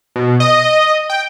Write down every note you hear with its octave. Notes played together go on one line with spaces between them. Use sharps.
B2
D#5
G5